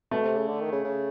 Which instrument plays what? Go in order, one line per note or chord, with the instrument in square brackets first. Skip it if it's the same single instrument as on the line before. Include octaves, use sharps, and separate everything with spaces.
[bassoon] B2 [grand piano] A3
[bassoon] C3
C#3
D3
D#3
C#3
C#3